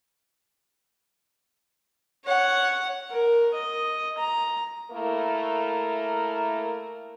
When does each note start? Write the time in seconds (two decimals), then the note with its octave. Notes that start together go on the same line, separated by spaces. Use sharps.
2.24 C#5 F#5
3.11 A#4
3.54 D#5
4.18 A#5
4.91 A3 A#3 E4 A#4